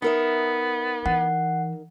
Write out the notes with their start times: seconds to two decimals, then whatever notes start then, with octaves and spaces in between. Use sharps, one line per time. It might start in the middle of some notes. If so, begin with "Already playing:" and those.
0.02 B3 D#4 A#4 E5
1.06 E3 F#5